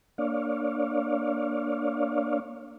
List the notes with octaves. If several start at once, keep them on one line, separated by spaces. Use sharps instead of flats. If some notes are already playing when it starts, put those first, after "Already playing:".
A#3 D4 C#5 D5 F5